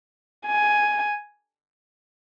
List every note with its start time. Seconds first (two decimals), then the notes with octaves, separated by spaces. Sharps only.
0.47 G#5